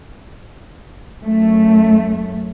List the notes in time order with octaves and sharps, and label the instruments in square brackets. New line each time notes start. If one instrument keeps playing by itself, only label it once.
[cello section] F#2 A3